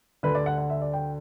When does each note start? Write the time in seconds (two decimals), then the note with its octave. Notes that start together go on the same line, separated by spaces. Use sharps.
0.23 D2 D3 B4
0.35 D5
0.46 F#5
0.58 F#5
0.70 E5
0.82 D5
0.93 G5